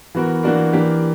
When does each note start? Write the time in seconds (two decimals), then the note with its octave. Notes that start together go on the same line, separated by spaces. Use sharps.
0.15 E3 B3 F#4 A#4
0.44 E3 A#3 D4 F#4 A#4
0.73 E3 A#3 D4 G4 A#4